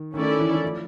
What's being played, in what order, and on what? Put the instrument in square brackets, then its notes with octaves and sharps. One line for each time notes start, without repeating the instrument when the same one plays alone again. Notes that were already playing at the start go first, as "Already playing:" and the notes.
Already playing: [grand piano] D#3
[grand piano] D#3 [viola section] A3 C#4 E4 A4 D5
[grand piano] E3
E3
F3